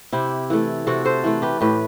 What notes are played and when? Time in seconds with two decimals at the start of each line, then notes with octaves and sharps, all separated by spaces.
0.12 C3 E4 G4
0.50 E3 A3
0.87 C3 F#4 A4
1.05 A4 C5
1.24 E3 A3
1.42 G4 B4
1.60 A2 G4 B4